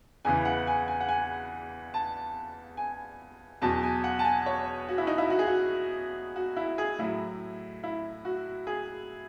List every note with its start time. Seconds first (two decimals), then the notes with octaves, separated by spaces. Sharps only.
0.25 E2 C#3 E3 G#5
0.45 F#5
0.67 G#5
0.88 G#5
1.00 F#5
1.09 G#5
1.94 A5
2.77 G#5
3.62 E2 B2 F#3 A5
3.83 G#5
4.04 F#5
4.19 A5
4.25 G#5
4.46 C#5
4.89 F#4
4.98 E4
5.07 D#4
5.18 E4
5.30 F#4
5.39 G#4
5.47 F#4
6.36 F#4
6.57 E4
6.78 G#4
6.99 A2 F#3 E4
7.84 E4
8.25 F#4
8.67 G#4